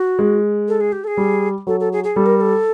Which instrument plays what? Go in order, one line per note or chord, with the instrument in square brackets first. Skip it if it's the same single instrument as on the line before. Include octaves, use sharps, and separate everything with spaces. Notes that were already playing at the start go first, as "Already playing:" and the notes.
Already playing: [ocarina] F#4
[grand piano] G#3
[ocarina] A4
G#4
G4
A4
G#4
[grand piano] G3
[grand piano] F#3 [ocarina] A4
[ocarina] A4
G#4
G#4
[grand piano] G3 [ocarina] A4
[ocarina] A#4
A#4
A4